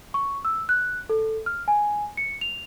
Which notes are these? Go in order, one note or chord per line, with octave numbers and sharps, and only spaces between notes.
C#6
E6
F#6
A4
F6
G#5
C#7
F7